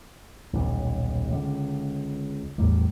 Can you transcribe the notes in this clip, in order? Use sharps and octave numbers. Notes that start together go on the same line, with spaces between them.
D#1 B1
C#2 D3
E2 A2 F#3 G3